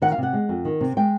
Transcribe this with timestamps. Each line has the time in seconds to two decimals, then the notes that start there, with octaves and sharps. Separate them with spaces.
0.02 D#3 F#5
0.12 F5
0.18 C3 F#5
0.33 G#3
0.49 F2
0.65 D#3
0.81 C3
0.97 G#3 G5